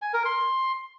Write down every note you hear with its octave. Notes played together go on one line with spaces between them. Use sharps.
G#5
A#4
C6